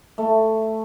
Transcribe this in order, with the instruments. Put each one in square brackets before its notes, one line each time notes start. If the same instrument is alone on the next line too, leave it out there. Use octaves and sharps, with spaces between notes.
[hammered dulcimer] A3